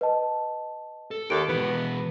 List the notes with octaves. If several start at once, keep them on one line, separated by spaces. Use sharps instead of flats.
B4 D#5 A5
A4
D#2 A4 A5 D7
B2 E3 B3